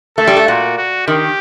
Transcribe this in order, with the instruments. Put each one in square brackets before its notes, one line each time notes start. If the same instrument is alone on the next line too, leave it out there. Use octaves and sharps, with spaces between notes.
[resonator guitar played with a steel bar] A3 [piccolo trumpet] A4
[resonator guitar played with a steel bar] G3
A3
[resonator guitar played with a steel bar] A#2 [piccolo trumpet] F#4
[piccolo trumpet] F#4
[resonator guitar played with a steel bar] D#3 [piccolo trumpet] G4